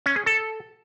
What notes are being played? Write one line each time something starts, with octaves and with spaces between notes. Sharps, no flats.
C#4
G#4
A4